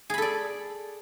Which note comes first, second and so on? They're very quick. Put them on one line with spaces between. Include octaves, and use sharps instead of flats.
G#4 B5 A4 D5